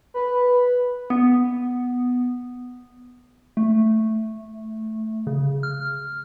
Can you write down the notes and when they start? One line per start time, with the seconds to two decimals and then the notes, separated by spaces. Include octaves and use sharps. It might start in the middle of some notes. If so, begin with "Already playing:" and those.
0.14 B4
1.10 B3
3.57 A3
5.27 C#3
5.63 F6